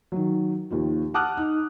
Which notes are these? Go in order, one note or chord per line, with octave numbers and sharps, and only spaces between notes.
D#3 F#3
D#2 D#3 F3
F#5 A5 D6 D#6 F6 F#6
D#4